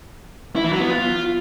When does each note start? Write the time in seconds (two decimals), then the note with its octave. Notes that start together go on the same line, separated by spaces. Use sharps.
0.56 E4
0.64 E3
0.73 F#3
0.81 B3
0.89 F4